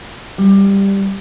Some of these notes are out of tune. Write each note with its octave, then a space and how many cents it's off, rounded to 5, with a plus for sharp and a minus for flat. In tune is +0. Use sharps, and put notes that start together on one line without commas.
G3 +10